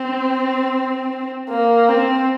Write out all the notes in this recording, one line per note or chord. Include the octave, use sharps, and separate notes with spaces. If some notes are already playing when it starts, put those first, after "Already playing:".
Already playing: C4
A#3
C4